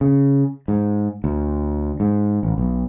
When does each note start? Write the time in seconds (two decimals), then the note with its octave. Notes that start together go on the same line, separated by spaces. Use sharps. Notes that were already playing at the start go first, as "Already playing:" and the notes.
0.01 C#3
0.68 G#2
1.24 D2
2.00 G#2
2.43 A1
2.58 B1